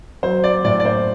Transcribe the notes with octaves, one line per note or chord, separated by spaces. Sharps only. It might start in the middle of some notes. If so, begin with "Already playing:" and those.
F#3 C5
D5
A2 D5
D5
C5